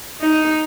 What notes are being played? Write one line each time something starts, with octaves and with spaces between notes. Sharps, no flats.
D#4